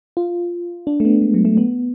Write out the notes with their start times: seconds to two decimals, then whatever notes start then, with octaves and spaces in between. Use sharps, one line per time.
0.17 F4
0.87 D4
1.00 A3
1.05 B3
1.22 G#3
1.34 F#3
1.45 A3
1.57 B3